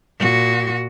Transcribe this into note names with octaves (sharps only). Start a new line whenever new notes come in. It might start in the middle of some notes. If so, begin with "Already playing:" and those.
A#2 F#4